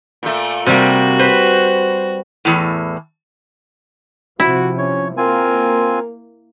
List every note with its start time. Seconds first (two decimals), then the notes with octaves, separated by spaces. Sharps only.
0.23 A#2 A3
0.66 C3 G3 A#3 F#4
1.19 B4 C5
2.45 E2 A2
4.40 C3 F3 E4 F#4
4.78 C#4 C#5
5.17 A#3 C4 F4 A#4 G#5